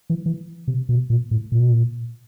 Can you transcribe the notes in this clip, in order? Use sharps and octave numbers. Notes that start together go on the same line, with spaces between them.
E3
E3
C3
B2
A#2
A2
A#2
B2
A#2